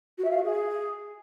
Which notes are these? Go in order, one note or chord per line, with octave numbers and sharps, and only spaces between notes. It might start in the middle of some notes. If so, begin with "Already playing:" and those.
F#4
E5
F5
F#4
G#4